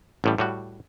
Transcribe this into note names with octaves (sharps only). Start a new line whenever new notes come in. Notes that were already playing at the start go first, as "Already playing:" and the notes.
A1 A2 G3
A2 G3 F#4